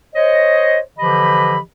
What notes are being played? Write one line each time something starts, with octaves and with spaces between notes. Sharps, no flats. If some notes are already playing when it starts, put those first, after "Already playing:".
C5 C#5 D#5
D3 E3 F3 G4 D#5 B5